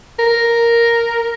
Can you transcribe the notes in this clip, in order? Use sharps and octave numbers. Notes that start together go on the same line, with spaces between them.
A#4